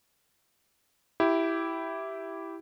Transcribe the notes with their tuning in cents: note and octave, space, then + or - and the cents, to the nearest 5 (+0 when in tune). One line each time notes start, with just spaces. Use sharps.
E4 +0 G4 -10